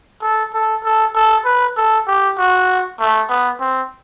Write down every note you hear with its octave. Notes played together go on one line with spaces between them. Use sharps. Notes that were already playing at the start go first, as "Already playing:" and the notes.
A4
A4
A4
A4
B4
A4
G4
F#4
A3
B3
C4